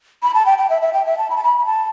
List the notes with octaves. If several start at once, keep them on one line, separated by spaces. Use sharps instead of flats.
B5
A5
G5
G5
E5
E5
G5
E5
A5
B5
A5
B5
B5
A5